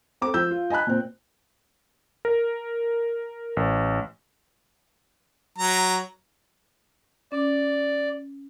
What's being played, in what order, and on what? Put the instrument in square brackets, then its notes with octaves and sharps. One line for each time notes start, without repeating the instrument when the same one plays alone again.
[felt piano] C4 A4 D6
F3 E6 G6
F4
D#5 G#5 A5 B5 F#6
A#2 C4
[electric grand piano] A#4
A1
[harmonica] F#3 A#5
[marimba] C#4 D6 [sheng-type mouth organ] D5